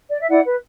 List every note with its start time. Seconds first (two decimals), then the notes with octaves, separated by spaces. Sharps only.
0.09 D5
0.19 E5
0.29 E4 D5 F#5
0.45 B4